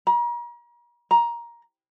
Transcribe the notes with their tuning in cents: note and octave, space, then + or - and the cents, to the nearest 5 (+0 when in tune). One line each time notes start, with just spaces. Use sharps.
A#5 +40
A#5 +15